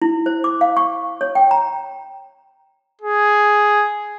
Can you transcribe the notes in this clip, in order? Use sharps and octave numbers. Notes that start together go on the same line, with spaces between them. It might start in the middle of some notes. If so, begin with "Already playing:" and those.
E4
C5
D6
F5
C#6
C#5
G5
A#5
G#4